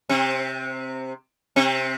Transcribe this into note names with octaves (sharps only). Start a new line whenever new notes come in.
C3 C4
C3 C4